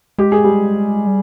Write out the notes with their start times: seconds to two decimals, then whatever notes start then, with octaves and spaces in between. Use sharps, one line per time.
0.18 G#3 G4
0.32 G#4
0.44 G3 G4
1.07 G3